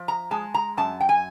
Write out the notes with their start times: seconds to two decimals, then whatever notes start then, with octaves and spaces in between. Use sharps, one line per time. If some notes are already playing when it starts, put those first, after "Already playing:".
Already playing: F3
0.08 A#5
0.31 G#3 A5
0.54 A#5
0.77 F#2 A5
1.01 G5
1.09 G#5